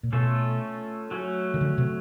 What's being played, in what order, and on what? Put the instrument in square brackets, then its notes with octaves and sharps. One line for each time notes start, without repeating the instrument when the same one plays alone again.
[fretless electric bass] A#2
[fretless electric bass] B2 [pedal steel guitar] A3 C#4 F4 A4
[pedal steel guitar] F#3 A3 C#4
[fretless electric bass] D#3
D3
C3